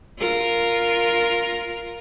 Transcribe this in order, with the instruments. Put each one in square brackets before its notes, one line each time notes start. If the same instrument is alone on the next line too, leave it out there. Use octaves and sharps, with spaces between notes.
[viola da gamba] F4 A#4